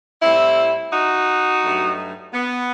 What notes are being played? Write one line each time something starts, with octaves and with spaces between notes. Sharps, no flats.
A2 G3 C4 E4
D#4 F#4
G2 F#3 A3
B3